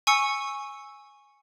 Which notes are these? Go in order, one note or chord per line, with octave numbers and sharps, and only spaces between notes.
G#5 C#6 E6 C#7